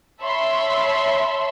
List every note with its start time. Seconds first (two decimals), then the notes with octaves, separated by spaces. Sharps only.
0.21 C#5 E5 A5 B5 C6